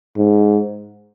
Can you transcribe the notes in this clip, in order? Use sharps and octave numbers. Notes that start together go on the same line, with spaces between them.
G#2